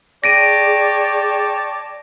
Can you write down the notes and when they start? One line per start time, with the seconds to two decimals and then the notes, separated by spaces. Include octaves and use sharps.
0.24 G#4 C#5 D5 G5 A5 A#6 D7 D#7